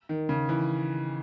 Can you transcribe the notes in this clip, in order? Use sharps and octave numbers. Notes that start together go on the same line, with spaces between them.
D#3
C#3
E3